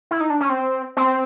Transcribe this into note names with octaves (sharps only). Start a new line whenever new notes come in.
E4
D#4
D4
C#4
C4
C4